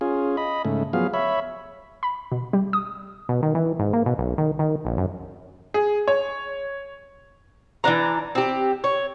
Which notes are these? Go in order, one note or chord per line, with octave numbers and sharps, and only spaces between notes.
C#4 F4 G#4
D#5 B5
G#2 C#3 A3
F3 F#3 B3 G#4 F5
C#5 E5 B5
B5
B2
G3
D#6
B2
D#3
E3
G#2
A#3
B2
B1
D#3
D#3
A#1
F#2
G#4
C#5
E3 C#4 D4 A#5
C4 G4
C#5